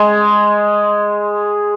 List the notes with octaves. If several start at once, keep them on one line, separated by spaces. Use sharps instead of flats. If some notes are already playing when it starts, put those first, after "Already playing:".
Already playing: G#3